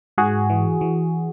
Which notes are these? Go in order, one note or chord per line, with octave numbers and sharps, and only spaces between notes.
G#2 F#4 G#4
E3
E3